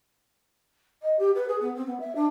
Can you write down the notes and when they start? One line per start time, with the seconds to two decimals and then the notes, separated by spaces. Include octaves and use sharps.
1.02 D#5
1.19 G4
1.35 B4
1.48 G#4
1.61 B3
1.75 C4
1.87 B3
2.00 E5
2.15 D4